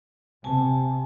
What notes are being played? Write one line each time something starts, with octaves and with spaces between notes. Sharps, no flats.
C3 G#5 A5